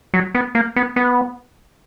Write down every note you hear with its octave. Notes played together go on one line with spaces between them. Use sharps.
F#3
B3
A#3
B3
B3